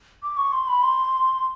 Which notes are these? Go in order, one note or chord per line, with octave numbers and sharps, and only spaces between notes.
D6
C#6
C6
B5
C6